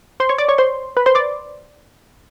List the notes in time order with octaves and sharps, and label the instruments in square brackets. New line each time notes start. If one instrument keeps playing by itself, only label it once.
[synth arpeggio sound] C5 C6
C#5 C#6
D5 D6
C#5 C#6
C5 C6
B4 B5
C5 C6
D5 D6